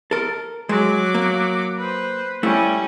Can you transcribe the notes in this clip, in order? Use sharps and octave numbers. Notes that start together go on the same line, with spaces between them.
A4 A#4
F#3 G#3 D6
A#3
B4 C5
G3 A3 C#4 E4